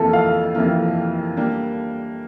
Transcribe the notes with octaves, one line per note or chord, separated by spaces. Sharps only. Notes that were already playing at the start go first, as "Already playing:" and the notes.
Already playing: F2 C3 E3 A#3 F4 A4 A#4
F5
F2 C3 E3 A#3 F4
G3 A#3 D4